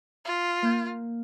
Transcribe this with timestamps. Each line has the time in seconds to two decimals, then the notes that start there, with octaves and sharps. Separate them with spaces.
0.25 F4
0.62 A#3 G6